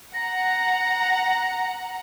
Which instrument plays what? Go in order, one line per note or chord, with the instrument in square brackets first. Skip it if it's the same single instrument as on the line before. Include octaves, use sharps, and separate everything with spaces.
[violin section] F#5 A#5 [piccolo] A#6